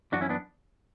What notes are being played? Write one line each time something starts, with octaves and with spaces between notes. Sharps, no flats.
F#2 E3 D4 F#4
C#4 E4
B3 D4